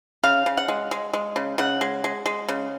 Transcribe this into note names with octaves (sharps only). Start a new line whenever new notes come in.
C#3 F5
C#3
F#5
G#3
G#3
G#3
C#3
C#3 F#5
G#3
G#3
G#3
C#3